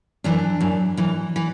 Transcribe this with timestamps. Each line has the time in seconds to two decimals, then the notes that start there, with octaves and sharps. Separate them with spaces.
0.24 F#2 E3 D4
0.61 F#2 E3
0.97 F#2 E3
1.36 E3